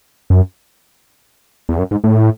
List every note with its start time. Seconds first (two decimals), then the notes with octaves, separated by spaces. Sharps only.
0.30 F#2
1.69 E2
1.79 F#2
1.91 G#2
2.04 A2